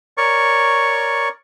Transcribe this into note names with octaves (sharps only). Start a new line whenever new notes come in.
A#4 C#5 D5 C#6